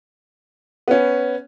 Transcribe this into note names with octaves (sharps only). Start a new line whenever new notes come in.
B3 C#4